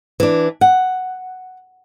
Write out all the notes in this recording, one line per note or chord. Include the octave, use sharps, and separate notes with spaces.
E3 D4
F#5